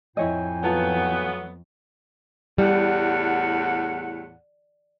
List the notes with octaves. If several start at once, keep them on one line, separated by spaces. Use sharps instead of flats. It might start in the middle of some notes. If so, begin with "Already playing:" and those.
F2 A2 E4 C#5 D#5 G5 G#5
F#3 A3 B3 F4 A5 A#5
E2 A2 G3 F#5